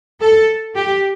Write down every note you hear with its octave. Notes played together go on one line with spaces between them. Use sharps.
A4
G4